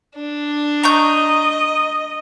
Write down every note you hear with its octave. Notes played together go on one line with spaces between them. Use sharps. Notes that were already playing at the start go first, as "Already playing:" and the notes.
D4
D#5 A#5 C#6 G6